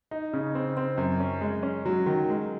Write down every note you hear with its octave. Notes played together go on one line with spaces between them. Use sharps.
D#4
C#3
C4
C4
F#2
C#4
G#3
C#4
F#3
D#3
G#3